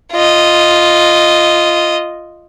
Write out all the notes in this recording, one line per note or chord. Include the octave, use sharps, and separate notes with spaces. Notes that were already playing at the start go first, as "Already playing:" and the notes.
F4 D#5